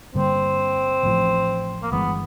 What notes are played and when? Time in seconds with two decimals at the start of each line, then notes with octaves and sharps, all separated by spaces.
0.15 G2 D3 G3 A#3 C4
1.04 A1 A2 F3
1.83 A#3
1.92 G1 G2 E3 G#3 B3